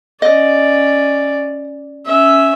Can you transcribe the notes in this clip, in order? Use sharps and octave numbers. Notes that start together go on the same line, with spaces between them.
C#4 D5 D#5
C#4 E5